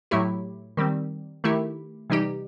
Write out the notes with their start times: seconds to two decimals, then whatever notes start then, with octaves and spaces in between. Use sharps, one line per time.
0.11 A2 F#3 A3 E4 G4
0.77 D#3 G3 C4
1.44 D#3 A3 E4 G4
2.10 C3 E3 G3 D#4 G4